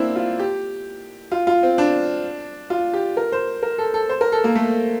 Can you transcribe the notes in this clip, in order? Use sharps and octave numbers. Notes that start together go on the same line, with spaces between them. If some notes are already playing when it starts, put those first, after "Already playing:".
Already playing: A#3 C4 D4 E4
F4
G4
F4
F4
C4
D4
F4
G4
A#4
C5
A#4
A4
A4
C5
A#4
A4
A#3
A3